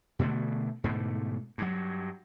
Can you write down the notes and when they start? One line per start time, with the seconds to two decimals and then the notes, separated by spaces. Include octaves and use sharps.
0.19 B2 D3 A3 B3
0.84 G#2 B2 D3 A3
1.58 G2 F#3